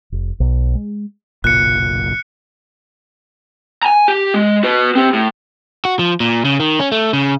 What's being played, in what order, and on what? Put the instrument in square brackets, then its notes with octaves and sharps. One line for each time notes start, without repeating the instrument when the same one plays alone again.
[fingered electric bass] F1
B1
G#3
[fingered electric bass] F#1 B1 A#2 [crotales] F#6 C#7
[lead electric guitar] G#5 A#5
G4
G#3
F#4 B4
C4 G4
A2
[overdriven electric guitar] F#4
F3
A#2
C#3
D#3
C#4
A3
C#3